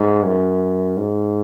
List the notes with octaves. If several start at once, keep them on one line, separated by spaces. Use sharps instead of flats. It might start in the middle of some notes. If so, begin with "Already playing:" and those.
Already playing: G#2
F#2
G#2